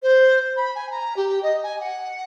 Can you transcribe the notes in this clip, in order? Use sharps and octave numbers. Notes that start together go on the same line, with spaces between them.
C5
B5
G#5
A#5
G4
D#5
G#5
F#5